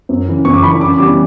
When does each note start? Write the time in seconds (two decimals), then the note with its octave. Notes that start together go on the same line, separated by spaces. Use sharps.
0.09 F#2
0.27 C#3 E3
0.45 F#2 C#6
0.54 D6
0.62 C#3 E3 B5
0.80 C#3 D6
0.98 E3 G3 B3 D6